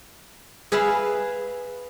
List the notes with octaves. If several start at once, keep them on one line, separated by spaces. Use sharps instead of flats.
G#4 B4 E5 F5 B5